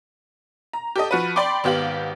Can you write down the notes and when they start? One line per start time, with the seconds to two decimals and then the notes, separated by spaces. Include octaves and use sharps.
0.73 A#5
0.96 G4 A4 D#5
1.11 F3 F#4 B4
1.36 D5 G5 B5 C6 D6
1.64 G#1 B3 G4 F5 F#7